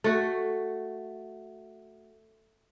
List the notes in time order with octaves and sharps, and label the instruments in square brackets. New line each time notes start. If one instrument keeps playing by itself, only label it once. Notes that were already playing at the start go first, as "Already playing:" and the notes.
[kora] A3 F#4